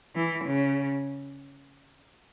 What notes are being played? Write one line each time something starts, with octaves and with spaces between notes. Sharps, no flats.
E3
C#3